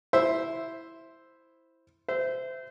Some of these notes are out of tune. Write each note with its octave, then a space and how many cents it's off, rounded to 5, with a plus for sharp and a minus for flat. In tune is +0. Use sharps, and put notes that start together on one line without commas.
E4 +0 C5 +0 E5 +0
C5 -25 E5 +0